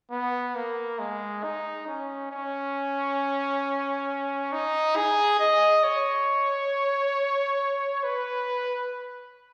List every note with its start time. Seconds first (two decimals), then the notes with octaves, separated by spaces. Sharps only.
0.11 B3
0.55 A#3
0.99 G#3
1.44 D#4
1.88 C#4
2.31 C#4
4.52 D#4
4.96 G#4
5.40 D#5
5.84 C#5
8.03 B4